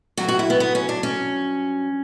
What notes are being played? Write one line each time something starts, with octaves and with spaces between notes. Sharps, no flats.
G2 F#3 F#4
F#4
E4
B3
B3
C#4
D4
C#4